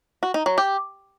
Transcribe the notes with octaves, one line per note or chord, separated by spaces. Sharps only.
F#4
D#4
F#3
G4